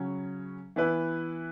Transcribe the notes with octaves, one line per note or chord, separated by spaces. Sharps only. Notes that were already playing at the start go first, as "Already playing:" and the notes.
Already playing: C#3 F#3 C#4
E3 B3 E4 B4